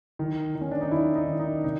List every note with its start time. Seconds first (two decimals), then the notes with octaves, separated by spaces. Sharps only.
0.19 D#3
0.55 D#3
0.61 C#4
0.71 D4
0.81 D#4
0.91 D#3 E4
1.16 D#4
1.27 D#3
1.39 D#4
1.64 C3 D#4